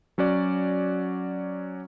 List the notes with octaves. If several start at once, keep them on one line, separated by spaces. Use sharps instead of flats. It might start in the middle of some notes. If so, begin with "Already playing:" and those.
F#3 C#4 F#4 D5